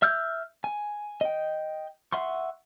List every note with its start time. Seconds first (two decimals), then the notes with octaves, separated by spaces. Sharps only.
0.02 E5 E6 F6 G6
0.64 G#5
1.21 D#5 G5
2.12 E5 F#5 C6 C#6